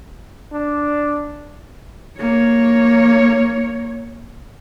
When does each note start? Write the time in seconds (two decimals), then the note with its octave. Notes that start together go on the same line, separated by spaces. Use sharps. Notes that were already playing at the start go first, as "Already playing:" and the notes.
0.52 D4
2.18 A#3 C#5